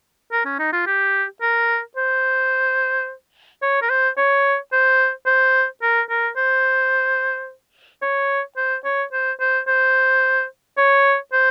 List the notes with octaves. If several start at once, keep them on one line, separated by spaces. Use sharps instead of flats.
A#4
C#4
D#4
F4
G4
A#4
C5
C#5
A#4
C5
C#5
C5
C5
A#4
A#4
C5
C#5
C5
C#5
C5
C5
C5
C#5
C5